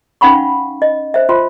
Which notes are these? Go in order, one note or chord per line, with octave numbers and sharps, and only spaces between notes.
C#4 D#4 F5 F#5 B5 C#6
D#5
C5 E5
F4 C5 C6